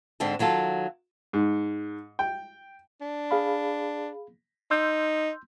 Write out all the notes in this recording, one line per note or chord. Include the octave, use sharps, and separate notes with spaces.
G#2 D3 C4 A4
D#3 F#3 F4 A4
G#2
G5
D4
G#4 F5 B5
D#4 C6 E6 G6